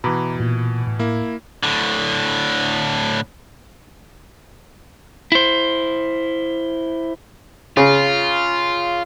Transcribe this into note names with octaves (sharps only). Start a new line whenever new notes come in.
B2 E3 A#5 B5 D6
A#2
A2
A#3 E4
A2 D3
E4 C5
C#3 F4